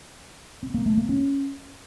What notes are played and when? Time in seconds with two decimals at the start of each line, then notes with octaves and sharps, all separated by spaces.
0.63 C4
0.74 A#3
0.86 A3
0.97 A#3
1.09 C#4